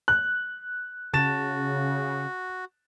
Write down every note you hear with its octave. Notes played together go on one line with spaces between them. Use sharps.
F#6
C#3 F#4 A5 A6 E7